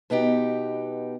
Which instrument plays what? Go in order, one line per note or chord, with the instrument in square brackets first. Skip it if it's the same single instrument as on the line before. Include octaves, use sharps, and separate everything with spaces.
[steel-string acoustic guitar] B2 B3 D#4 G4